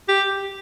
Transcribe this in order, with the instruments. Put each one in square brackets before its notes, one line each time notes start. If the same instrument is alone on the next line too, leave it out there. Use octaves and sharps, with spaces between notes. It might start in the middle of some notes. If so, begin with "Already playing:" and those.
[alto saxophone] G4